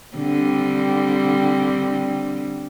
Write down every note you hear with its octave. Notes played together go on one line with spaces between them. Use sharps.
D3 G3 C4